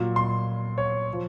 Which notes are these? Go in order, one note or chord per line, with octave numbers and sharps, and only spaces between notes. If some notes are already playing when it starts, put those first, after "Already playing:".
Already playing: A#2 F#3
C6
C#5
F3